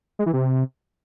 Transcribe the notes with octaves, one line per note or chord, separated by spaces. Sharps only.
G#3
E3
C3